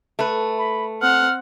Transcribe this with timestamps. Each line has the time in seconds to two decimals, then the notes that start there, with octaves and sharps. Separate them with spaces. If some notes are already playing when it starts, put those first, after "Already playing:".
0.19 A3 B4
0.58 B5
1.02 C4 F#5 F6